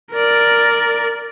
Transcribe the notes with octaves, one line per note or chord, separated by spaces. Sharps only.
A#4 D5